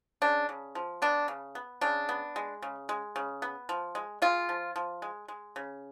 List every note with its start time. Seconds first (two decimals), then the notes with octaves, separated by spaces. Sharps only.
0.22 C#3 D4
0.49 C#3
0.75 F3
1.02 B3 D4
1.28 C#3
1.55 B3
1.81 C#3 D4
2.09 B3
2.36 G#3
2.62 C#3
2.89 G#3
3.16 C#3
3.42 B3
3.69 F3
3.95 G#3
4.22 G#3 F4
4.49 F3
4.76 F3
5.02 G#3
5.28 G#3
5.56 C#3